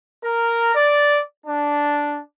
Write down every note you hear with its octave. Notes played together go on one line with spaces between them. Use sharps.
A#4
D5
D4